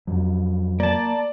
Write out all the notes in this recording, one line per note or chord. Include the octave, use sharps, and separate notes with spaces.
F2 F#3
A#3 D5 A5